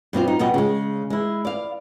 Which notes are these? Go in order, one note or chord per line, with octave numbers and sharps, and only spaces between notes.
G2 B2 C4 F4
D#4
F2 B2 G3 B3 D#5
C#3 G#3
G#3 E4
D5 F5